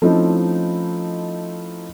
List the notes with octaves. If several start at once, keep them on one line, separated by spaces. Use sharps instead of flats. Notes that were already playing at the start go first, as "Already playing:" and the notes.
F3 A3 C4 C#4 D#4 E4